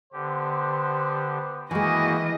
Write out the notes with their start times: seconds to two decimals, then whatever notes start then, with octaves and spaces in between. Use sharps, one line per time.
0.13 D3 B3 G4 C5
1.71 D#3 E3 G#3 A#3 E4 F#4 D#5 G#5